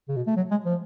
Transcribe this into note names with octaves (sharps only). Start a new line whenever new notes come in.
C#3
B2
A3
F#3
G#3
F3